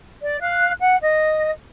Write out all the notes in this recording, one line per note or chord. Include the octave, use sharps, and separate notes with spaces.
D5
F5 F#6
F#5
D#5